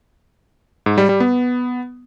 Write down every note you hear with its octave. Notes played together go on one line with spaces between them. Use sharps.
G#2
G3
G3
B3